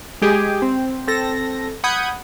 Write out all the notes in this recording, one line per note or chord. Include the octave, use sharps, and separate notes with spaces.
G#3 G4 G#4
C4
C4 A4 A#6
F#5 B5 D#6 G6 G#6